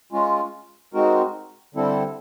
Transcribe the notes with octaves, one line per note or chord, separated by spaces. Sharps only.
G#3 C#4 F4
G#3 C4 D#4 F#4 A#4
D3 G3 C4 E4 A4